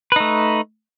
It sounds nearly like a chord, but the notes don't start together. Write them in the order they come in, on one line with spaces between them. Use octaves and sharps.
B4 D#4 A3